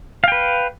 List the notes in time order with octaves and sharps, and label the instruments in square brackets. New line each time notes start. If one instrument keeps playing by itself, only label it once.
[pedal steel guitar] F5
G5
B4